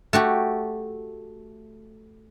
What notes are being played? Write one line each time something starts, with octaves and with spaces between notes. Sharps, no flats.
A3 F#4 G4